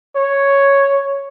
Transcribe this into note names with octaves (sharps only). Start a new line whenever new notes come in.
C#5